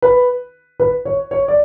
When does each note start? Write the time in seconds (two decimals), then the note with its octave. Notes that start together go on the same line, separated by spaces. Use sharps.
0.02 B4
0.80 B4
1.05 C#5
1.31 C#5
1.48 D5